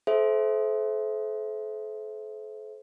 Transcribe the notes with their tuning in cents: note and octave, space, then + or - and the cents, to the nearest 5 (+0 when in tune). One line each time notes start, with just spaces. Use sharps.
A4 -35 C5 +0 E5 +0